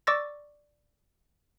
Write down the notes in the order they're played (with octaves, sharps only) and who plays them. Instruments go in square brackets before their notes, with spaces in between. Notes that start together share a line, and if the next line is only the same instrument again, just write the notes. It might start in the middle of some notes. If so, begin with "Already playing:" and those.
[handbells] D5 C#6 D6 E6 A6 A#6